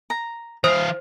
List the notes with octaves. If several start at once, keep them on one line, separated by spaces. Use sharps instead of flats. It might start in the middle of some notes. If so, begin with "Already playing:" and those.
A#5
E3 C5 F5 D#6